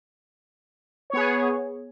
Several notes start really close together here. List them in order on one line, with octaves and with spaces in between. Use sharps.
C#5 B3 G#4